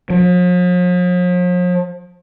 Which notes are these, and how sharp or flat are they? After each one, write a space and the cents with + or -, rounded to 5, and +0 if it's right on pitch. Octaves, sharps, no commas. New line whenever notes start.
F3 +45